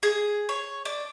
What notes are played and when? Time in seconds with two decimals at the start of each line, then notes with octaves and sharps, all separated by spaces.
0.03 G#4
0.49 C#5
0.85 D4